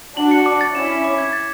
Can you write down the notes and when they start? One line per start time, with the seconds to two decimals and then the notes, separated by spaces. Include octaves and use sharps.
0.16 D4 F#4 F#7
0.31 C#7
0.46 D6
0.61 A6
0.74 C#4 E4 E7
0.90 B6
1.04 D6
1.18 G#6
1.33 A6